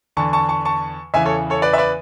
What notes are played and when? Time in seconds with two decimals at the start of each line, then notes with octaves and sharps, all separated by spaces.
0.17 E2 D3 A5 C#6
0.33 A5 C#6
0.49 A5 C#6
0.65 A5 C#6
1.14 E2 C#3 E3 E5 G#5
1.26 A4 C#5
1.50 A4 C#5
1.62 B4 D5
1.73 E5
1.78 B4 D5